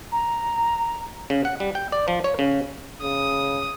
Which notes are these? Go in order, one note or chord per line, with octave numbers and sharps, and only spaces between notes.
A#5
C#3
F#5
G3
G5
D5
F3
C#5
C#3
C#3 D#6